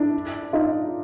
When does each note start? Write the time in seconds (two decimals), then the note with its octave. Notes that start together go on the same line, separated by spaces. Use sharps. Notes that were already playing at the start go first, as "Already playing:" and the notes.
Already playing: D4 E4
0.53 D#4 F4